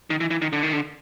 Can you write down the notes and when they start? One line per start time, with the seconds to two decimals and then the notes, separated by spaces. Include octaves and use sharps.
0.10 D#3
0.20 E3
0.31 E3
0.42 D#3
0.53 D3
0.63 D#3
0.73 D3